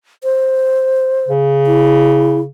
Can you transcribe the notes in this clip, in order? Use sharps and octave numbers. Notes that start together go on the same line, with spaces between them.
C5
C#3
E4